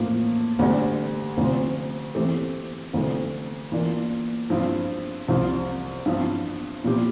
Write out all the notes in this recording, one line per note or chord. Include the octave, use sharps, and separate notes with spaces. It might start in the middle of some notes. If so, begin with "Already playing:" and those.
Already playing: A2 F3 A#3
D2 D3 G3
D2 C3 F3
E3 A3 C4 G4
D2 C3 F3 A3
E3 A#3 D4 F4 A#4
G2 F3 C4 E4
C2 C3 F3
G2 F3 C4 E4
A#2 F3 C4 E4 G4